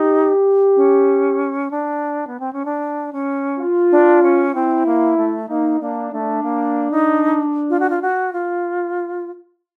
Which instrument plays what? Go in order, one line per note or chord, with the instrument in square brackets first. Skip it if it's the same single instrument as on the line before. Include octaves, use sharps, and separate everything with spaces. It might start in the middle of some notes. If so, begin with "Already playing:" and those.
Already playing: [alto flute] D#4 [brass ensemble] G4
[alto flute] C#4
D4
B3
C4
C#4
D4
C#4
[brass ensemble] F4
[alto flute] D4
C#4
[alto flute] C4 [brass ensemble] E4
[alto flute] A#3
A3
[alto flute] A#3 [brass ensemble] D#4
[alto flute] A#3 [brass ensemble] D4
[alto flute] A3 [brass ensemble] D4
[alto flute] A#3
D#4
F4
F#4
F4
F#4
F4